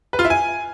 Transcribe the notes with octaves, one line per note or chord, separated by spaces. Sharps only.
B4
F4
E4
G#5